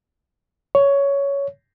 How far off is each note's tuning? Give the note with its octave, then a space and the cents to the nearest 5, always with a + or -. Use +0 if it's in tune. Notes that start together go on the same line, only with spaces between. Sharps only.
C#5 +10